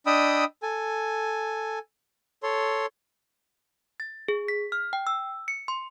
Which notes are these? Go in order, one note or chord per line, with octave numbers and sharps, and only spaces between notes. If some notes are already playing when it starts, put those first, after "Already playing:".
D4 D#5 G5 B5 D#6 E6
A4 G#5
A4 C#5 C6
A6
G#4
B6
F6
G5
E6
C#7
C6